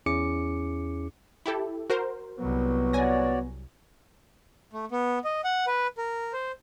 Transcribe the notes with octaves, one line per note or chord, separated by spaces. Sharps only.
E2 C#4 E4 G#4 D6 C#7
E4 G4 A4
F#4 A#4 C5
C2 F#3 B3
F#4 C#5 D5 G#5 A#6
A3
B3
D#5
F#5
B4
A#4
C5